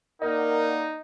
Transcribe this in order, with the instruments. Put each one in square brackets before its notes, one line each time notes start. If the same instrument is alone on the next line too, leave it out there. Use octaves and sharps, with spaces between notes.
[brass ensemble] A#3 D5 F#5 [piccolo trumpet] D#4 [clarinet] A#4 [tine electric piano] D#5